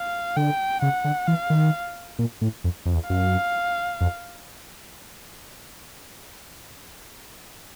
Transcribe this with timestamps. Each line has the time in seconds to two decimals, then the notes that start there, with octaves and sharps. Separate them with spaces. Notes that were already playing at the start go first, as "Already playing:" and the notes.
Already playing: F5
0.37 D3 G5
0.82 C#3 F#5
1.05 D3
1.28 E3 F5
1.50 D#3
2.19 A#2
2.41 A2
2.64 F2
2.85 F2
2.94 E2
3.10 F#2 F5
4.01 F2